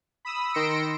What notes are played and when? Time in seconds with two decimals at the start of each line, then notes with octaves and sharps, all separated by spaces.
0.25 B5 D#6 E6
0.54 D#3 C6 E6 A#6 C#7 D7